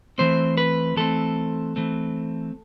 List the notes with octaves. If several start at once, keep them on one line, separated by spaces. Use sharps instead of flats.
E3 A3 C4 C5
B4
E3 A3 C4 A4
E3 A3 C4